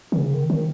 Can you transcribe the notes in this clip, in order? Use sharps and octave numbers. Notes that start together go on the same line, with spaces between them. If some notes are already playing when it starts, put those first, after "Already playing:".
D#3
C#3
D#3
D#3